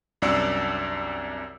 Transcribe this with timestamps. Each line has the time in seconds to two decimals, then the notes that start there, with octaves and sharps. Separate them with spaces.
0.22 C2 F#2 D4 D5 E6 C#7